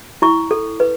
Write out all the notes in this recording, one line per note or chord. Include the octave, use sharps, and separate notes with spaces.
E4 C#6
A4
B4